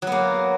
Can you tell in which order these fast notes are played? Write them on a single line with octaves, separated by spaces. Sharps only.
F#3 B3 A#3